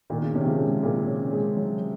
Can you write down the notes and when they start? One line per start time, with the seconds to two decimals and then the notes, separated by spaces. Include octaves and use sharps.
0.10 A#2 D#3
0.22 C#3
0.34 C3 D#3 C#4
0.46 C#3 F3
0.59 G#3
0.83 A#2 C#3
1.07 C#4
1.32 G#3
1.57 F#3